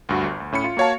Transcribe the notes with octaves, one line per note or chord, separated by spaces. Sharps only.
D2 G2 F#4
G1
D2
A2 C#4 B5 C#7
F4
A#3 F#4 C#5 F5 A5